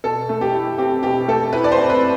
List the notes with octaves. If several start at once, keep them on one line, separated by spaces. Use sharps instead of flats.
B2 A4
A3
G4
E4
C4 G4
B2 G4
A3 A4
E4 B4
D5
C5
C4
B4